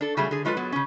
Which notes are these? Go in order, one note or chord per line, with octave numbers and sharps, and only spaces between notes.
D4 A4
C#3 F#3 G3 A3 G#4 C#5
D3 G#4
F#3 G#3 F4 A4 B4
F#3 B3
C#3 C#4